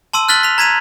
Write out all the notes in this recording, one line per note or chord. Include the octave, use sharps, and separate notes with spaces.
A5 C6 E6 D#7
F6 F#6 A6 B6 F#7 G7
B6 F7
A#5 G#6 B6 D#7 F7